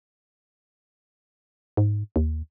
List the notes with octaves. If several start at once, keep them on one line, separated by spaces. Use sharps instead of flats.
G#2
D#2